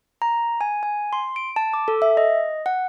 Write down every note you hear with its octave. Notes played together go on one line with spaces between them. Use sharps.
A#5
G#5
G#5
C6
D7
A5
D6
A4
E5
D#5
F#5